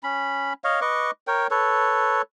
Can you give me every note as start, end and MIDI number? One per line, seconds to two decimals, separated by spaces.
0.03 0.53 61
0.03 0.53 83
0.64 0.80 73
0.64 0.80 75
0.64 0.80 77
0.81 1.11 71
0.81 1.11 75
0.81 1.11 85
0.81 1.11 86
1.27 1.47 70
1.27 1.47 73
1.27 1.47 79
1.51 2.22 69
1.51 2.22 71
1.51 2.22 73